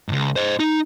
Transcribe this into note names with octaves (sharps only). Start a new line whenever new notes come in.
C#2 G#2
C5 D#5
D#4